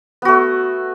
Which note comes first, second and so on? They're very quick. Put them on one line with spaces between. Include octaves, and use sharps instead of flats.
B3 F#4 A3